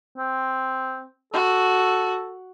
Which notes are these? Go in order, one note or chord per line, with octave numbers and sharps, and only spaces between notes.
C4
F#4 A4